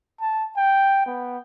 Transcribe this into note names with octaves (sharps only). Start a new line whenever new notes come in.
A5
G5
B3